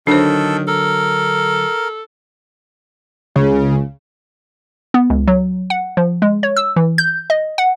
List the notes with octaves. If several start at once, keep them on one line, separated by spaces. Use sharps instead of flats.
D3 D#3 F#3 D4 A4 C5
A4 A#4
C#2 C#3
B3
C#2
F#3
F#5
F3
G#3
C#5
E6
E3
G6
D#5
F#5